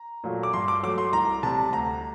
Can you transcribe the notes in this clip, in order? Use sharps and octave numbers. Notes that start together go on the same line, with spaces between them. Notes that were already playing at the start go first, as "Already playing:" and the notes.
Already playing: A#5
A#2 F#3 A3
D6
G2 C6
D6
F#3 A3 D6
C6
C2 A#5
C3 G3 A5
D2 A#5